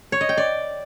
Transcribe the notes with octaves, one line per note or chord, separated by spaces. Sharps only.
C#5
D#5
G5
D5